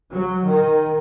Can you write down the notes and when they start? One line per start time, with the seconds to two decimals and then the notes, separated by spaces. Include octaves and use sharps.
0.11 F#3
0.48 D#3